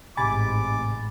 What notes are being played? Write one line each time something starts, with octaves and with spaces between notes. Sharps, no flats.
A1 G#2 C3 G#5 B5 D6 A6